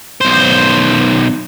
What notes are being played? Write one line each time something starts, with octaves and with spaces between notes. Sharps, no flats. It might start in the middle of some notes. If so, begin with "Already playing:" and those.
B1 C5